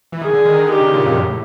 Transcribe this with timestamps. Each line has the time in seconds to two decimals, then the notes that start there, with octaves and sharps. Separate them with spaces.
0.12 E3
0.21 D#3 G#4
0.33 D3
0.45 D#3
0.58 D3
0.69 D3 G4
0.81 C#3
0.93 A#2
1.05 F2
1.17 F#2
1.29 A2